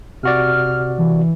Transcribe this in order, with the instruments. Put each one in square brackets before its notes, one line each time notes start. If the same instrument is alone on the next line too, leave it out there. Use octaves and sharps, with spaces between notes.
[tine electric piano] C3 F#4 D5 [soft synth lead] F6
[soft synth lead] E3